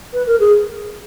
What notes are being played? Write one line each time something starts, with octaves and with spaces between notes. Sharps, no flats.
B4
A#4
G#4